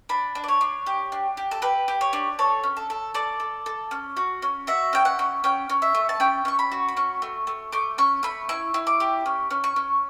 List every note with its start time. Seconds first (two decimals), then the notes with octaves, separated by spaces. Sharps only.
0.09 D4 B5
0.35 D4
0.44 D5
0.48 C#5
0.61 D4
0.86 G4
1.12 D4
1.37 G4
1.51 A4
1.62 G4 B4
1.88 G4
2.01 C#5
2.13 D4
2.39 A4 C#5
2.64 C#4
2.77 A4
2.90 A4
3.14 A4 D5
3.40 A4
3.66 A4
3.91 C#4
4.17 F#4
4.42 C#4
4.67 F#4 E5
4.93 C#4 G5
5.05 F#5
5.19 C#4
5.44 C#4 G5
5.70 C#4
5.82 E5
5.95 A3
6.09 A5
6.20 C#4 G5
6.45 C#4 C#6
6.59 B5
6.72 F#4
6.89 B5
6.97 C#4 C#6
7.22 A3
7.47 A3
7.72 A3 D6
7.98 C#4 C#6
8.23 A3 B5
8.49 E4 C#6
8.74 E4
8.87 D6
9.00 G4
9.26 C#4
9.51 C#4
9.64 C#6
9.76 C#4